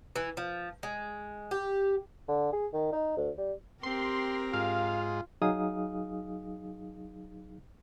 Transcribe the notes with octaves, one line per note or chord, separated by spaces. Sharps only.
E3
F3
G#3
G4
D3
G#4
D#3
D#4
D2
G3
C4 G4 A#4 C6
G#2 F4 F5
F#3 D#4 G#4 F5 D#6